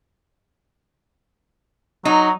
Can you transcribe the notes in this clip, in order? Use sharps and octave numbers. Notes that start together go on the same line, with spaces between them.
F#3 D#4